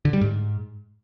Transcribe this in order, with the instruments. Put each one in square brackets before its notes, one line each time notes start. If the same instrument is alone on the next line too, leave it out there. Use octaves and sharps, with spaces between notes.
[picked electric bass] D3
G3
G#2